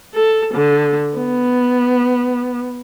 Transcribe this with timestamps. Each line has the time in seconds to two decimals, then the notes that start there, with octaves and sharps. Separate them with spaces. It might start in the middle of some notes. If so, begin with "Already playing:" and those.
0.14 A4
0.55 D3
1.17 B3